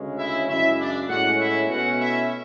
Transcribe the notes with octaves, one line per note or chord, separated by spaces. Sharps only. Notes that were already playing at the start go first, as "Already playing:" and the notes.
Already playing: D2 C#3 G#3 C#4
E4 E5
F#2 C#3 G#3 E4 E5
D4 D5
A2 G#3 C#4 F#4 F#5
E4 E5
B2 A3 C#4 F#4 F#5
E4 E5